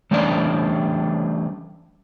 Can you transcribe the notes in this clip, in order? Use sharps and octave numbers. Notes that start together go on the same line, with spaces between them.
E3 G3 A3 C#4 D4 D5